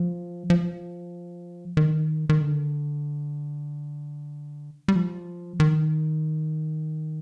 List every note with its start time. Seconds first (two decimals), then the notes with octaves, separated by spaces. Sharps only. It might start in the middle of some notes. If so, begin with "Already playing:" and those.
Already playing: F3
0.50 F3
1.77 D#3
2.29 D#3
2.41 D3
4.88 G3
4.96 F3
5.60 D#3